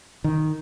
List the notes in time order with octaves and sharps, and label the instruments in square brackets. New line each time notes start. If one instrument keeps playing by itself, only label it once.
[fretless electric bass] D#3